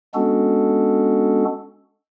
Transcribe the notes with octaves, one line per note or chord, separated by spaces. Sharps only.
G#3 B3 C#4 D4 F#4 A4